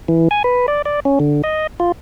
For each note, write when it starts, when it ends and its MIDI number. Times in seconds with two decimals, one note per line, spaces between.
0.08 0.28 52
0.31 0.43 80
0.44 0.66 71
0.68 0.82 74
0.85 1.00 74
1.05 1.19 61
1.20 1.42 50
1.44 1.67 75
1.80 1.92 65